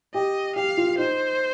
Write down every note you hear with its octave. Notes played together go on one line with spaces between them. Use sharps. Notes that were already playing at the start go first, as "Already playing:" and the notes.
G4 D#5
G4 F5
F4
D#4 C5